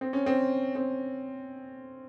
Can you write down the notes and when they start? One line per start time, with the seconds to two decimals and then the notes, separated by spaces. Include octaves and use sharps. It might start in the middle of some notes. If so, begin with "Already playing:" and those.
0.01 C4
0.13 C#4
0.26 C4
0.75 C4